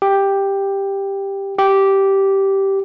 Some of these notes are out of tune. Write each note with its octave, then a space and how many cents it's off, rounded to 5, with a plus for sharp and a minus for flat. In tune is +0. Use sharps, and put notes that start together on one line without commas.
G4 +5
G4 -10